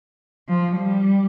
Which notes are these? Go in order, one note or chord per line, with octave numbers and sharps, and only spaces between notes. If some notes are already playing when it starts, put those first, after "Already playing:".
F3
G3